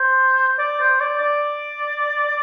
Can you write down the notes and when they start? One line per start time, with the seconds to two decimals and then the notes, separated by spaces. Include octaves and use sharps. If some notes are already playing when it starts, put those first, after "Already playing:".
Already playing: C5
0.59 D5
0.80 C5
1.00 D5
1.21 D5